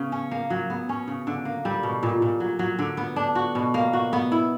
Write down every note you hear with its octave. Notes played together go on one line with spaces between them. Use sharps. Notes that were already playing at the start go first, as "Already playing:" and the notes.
Already playing: C#3 B3
C#4
A#3
F#3
B3
C#4
C#3
D3
A#3
G3
B2
A#2
A#2
F#3
F#3
D3
B3
D4
F#4
B2
A#3
F#4
B3
E4